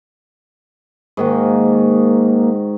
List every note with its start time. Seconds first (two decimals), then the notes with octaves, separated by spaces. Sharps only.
1.17 G#2 D#3 A#3 F#4